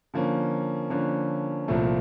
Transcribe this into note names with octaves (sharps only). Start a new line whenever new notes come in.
D3 F3 A#3 C#4
D3 F3 A#3 C#4
C2 A#2 F3 A3